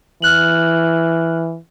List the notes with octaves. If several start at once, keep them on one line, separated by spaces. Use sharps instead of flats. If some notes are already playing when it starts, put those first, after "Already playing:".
E3 F6 F#6 F#7